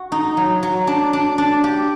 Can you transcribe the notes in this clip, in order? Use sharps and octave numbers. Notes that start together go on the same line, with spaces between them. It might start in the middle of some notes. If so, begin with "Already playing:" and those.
Already playing: F#4
D#4
F#3
F#3
D4
D4
D4
G4